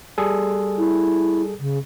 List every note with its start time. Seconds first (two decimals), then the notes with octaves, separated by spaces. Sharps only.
0.18 G3 G#4 A4
0.78 E4
1.59 C#3